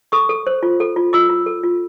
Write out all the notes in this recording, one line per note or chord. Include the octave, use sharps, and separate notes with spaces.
A4 C#6 D#6
A4
C5
F4
A4
F4
F4 D6 E6
F4
A4
F4